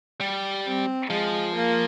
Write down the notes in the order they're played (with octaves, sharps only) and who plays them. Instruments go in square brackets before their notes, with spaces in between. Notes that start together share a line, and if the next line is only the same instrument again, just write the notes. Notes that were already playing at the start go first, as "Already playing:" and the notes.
[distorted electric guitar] G3
[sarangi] C4
[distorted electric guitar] F3 [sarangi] G#3
[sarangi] A#3